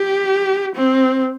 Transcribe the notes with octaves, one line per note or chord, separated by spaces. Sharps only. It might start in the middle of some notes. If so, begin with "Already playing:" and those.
Already playing: G4
C4